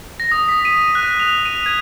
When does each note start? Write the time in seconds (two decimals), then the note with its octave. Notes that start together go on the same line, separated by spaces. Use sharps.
0.20 A#6
0.32 D#6
0.49 B6
0.65 D#7
0.95 F#6
1.20 F7
1.45 D#7
1.66 G#6